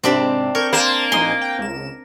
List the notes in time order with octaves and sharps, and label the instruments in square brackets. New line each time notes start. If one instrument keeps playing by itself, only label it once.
[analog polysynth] G#2 C3 [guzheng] C4 D4 B5
[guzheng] A#4 [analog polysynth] C#6 G6 G#6
[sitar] A#3 [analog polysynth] C5 A5 E7
[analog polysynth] A#1 D#4 G#5 [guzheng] C6
[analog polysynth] G5
C#2 E7